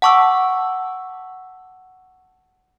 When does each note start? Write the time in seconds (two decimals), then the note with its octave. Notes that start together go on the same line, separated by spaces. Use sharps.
0.02 F#5 A5 C#6 D6 E6